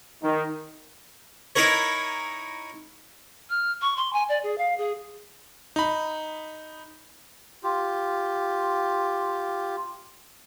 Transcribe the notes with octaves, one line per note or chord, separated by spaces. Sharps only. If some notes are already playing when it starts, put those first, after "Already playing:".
D#3
D#4 E4 A#4 C#5
F6
C#6
C6
G#5
D5
G#4
F5
G#4
D#4 B5
F4 G4